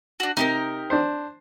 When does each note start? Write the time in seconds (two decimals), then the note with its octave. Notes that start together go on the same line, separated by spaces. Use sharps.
0.20 D4 F#4
0.37 C3 D#4 G4 A#4
0.90 D4 C5